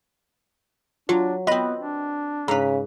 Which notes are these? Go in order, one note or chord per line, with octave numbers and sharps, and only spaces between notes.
F#3 D4 F4
B3 C4 F4 B4 D#5 B5
D4
G#2 C#3 B4 A#5 B6